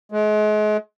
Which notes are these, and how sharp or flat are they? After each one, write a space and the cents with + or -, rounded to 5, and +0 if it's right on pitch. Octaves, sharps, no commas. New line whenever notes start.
G#3 +35